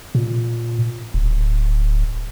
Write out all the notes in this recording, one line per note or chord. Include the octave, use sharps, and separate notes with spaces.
A#2
D1